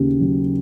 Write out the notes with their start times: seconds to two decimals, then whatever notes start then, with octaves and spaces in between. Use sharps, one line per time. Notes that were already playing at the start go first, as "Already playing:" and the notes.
Already playing: D#2 C#3
0.20 F#3